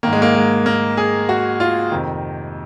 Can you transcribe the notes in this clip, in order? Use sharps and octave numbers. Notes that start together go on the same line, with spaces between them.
G#2 D#3 A#3
G#3
A#3
G#3
A#3
G#4
F#4
F4
F2 C3 D#3